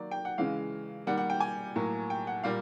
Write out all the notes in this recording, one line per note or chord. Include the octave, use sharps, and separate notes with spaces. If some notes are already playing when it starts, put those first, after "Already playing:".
Already playing: D#3 F#3 A#3 D5
G5
F#5
C#3 E3 G#3 F5
D#3 G3 A#3 F#5
F#5
G5
G#5
A2 F#3 A#3
G5
F#5
A#2 G3 A#3 F5